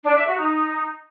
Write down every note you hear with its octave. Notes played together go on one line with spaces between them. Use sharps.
D4
E5
F#4
D#4